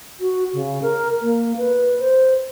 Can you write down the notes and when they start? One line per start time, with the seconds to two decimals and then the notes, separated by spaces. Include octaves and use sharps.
0.20 F#4
0.53 C#3
0.82 A#4
1.21 A#3
1.57 B4
2.00 C5